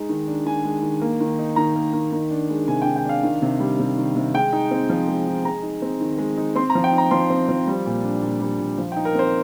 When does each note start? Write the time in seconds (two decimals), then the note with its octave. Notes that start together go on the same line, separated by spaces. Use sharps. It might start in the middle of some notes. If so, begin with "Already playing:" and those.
Already playing: G#3 D#4
0.09 D#3
0.27 D4
0.46 D#3 G#5
0.64 G#3
0.82 D#3
1.02 A#3
1.21 D#3
1.39 D#4
1.56 D#3 A#5
1.76 A#3
1.93 D#3
2.13 D#3
2.31 D4
2.50 G#3
2.68 C3 G#5
2.82 G5
2.86 D#3
2.96 G5
3.05 D4 F5
3.23 D#3
3.42 C3
3.60 G3
3.79 C3
3.98 D#3
4.16 C3
4.34 G#3 G5
4.53 D#4
4.71 C4
4.89 F3
5.08 G#3
5.27 D#4
5.45 G#3 A#5
5.63 D#4
5.82 C4
6.01 D#3
6.19 G#3
6.37 D#4
6.55 C4 C6
6.70 A#5
6.75 F3
6.84 G5
6.93 D#4
6.98 A#5
7.11 F3 C6
7.30 C4
7.49 F3
7.68 G3
7.86 A#2
8.04 D4
8.22 A#2
8.41 G3
8.59 A#2
8.78 F3
8.92 G5
8.96 D#4
9.05 A#4
9.15 C4 C5